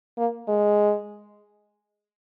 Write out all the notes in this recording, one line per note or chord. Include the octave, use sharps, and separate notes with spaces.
A#3
G#3